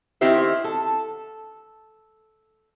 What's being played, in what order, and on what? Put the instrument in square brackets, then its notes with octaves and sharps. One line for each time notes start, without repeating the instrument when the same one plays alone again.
[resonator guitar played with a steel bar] D#3 C4 E4 G4 C5 E5
A4